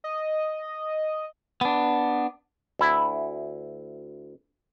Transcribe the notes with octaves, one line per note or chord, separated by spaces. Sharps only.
D#5
B3 D4
D2 E4